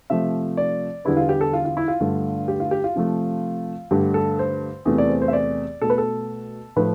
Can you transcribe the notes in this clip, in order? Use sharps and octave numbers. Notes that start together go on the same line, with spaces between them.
C3 F3 A3 E5
D5
E2 D3 G3 B3 E4
F4
G4
A4
F4
F4
E4
F4
G2 D3 A3
G4
F4
G4
F4
C3 F3 A3
G2 D3 A3 G4
A4
C5
E2 C3 E3 A3
D5
C5
C5
E5
D5
B2 A3 A4
B4
A4
A2 F3 A3 B4